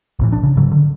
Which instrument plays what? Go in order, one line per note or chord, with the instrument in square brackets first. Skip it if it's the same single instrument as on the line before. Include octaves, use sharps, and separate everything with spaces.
[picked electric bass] B1 A2 E3
A#1 D4
C#3
G#2 C#3 F#3
D3